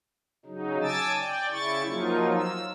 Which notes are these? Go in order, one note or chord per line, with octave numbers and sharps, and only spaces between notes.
C#3 F#3 D#4
G#5 A5 D6 E6 A6
D5 G5
C#3 E4 C#6 A6
F3 F#3 A#3 D#4 F4
E6